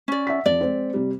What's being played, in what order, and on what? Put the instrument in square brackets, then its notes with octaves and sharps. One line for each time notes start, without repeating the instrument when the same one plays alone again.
[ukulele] C#4 D5
[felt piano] E5 F#5 B6
[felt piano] F2 F3 [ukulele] D5
[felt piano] G#3 C4
C3 G3